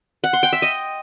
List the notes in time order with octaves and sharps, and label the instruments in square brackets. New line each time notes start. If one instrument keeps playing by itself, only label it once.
[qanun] F#5
C6
G5
E5
D#5